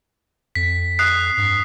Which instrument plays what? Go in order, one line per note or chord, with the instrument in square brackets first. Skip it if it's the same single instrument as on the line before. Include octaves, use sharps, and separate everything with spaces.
[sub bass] F2 [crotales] B6
[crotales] D#6 F#6 C7
[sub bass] G2